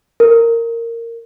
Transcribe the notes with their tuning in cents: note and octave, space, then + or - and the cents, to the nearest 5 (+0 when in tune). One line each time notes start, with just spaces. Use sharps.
A#4 -15